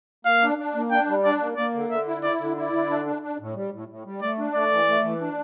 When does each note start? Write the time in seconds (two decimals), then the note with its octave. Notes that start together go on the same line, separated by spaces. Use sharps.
0.25 A#3 F5
0.42 D4
0.58 D4
0.75 A#3
0.91 D4 G5
1.07 G3
1.24 D4 D5
1.41 A#3
1.57 A#3 D5
1.74 D3
1.90 D3 E5
2.07 E4
2.23 E4 D5
2.40 D3
2.56 E4 D5
2.73 D3
2.89 D4
3.05 D4
3.22 D4
3.39 A2
3.55 G3
3.72 A2
3.88 A2
4.05 G3
4.21 A3 D5
4.38 D4
4.54 A3 D5
4.71 E3
4.88 A3
5.03 E3
5.21 D4